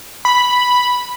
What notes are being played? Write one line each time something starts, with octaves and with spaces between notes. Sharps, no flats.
B5